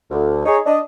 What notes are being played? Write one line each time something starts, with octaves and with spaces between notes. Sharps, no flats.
D2
D#4 G#4 C#5
D4 D#5